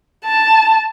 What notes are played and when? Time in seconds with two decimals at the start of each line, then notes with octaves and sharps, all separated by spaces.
0.25 A5